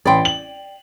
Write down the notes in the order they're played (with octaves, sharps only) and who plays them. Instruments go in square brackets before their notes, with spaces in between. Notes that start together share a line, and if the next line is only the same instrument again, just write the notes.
[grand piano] A1 B5 C6 [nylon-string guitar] D5 G5
[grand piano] F#7